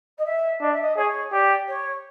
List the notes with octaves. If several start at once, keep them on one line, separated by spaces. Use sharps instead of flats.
D#5
E5
D4 D#5
E5
D#5
G#4 C#5
G4 D5
C#5